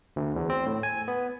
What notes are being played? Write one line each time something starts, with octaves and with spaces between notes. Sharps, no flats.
D2
E2
C4
A2
G#5
B3